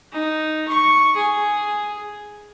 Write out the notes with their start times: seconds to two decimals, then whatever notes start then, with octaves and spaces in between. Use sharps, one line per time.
0.12 D#4
0.68 C#6
1.16 G#4